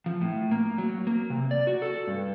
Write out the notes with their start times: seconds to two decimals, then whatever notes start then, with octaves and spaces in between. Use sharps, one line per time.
0.06 F3
0.21 A2
0.51 A#3
0.78 F#3
1.07 A#3
1.30 C3
1.51 D5
1.67 F#4
1.82 A4
2.07 G2